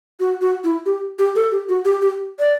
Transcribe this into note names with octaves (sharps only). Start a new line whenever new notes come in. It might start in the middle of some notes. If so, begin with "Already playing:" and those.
F#4
F#4
E4
G4
G4
A4
G4
F#4
G4
G4
D5